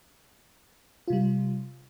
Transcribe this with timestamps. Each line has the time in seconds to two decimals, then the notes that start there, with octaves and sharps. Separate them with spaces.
1.08 F4
1.10 C3
1.13 G3